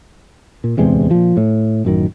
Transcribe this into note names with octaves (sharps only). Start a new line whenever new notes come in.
A#2
D1 E2 C3 G#3
A#2 F3
A2
A1 F#2 D#3